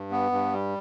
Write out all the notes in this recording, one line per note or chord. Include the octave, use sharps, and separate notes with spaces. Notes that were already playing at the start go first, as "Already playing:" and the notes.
Already playing: G2
B3
G2
G3